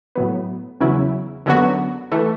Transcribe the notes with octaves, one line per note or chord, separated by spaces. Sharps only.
A2 F#3 B3
E2 C#3 F#3 C#4 E4
F#2 D3 F#3 B3 F#4
E3 A3